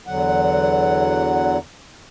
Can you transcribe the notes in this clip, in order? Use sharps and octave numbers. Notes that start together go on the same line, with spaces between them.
E2 D3 F#3 F#5